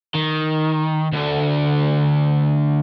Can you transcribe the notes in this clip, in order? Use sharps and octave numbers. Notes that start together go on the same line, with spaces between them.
D#3
D2 D3